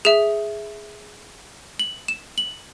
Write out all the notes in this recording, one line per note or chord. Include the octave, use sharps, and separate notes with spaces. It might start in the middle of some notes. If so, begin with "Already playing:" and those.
G#4 E5 E7
F#7
E7
F#7